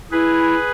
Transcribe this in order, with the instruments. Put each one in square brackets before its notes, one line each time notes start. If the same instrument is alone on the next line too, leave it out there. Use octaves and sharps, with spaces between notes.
[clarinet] E4 [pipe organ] G#4 B4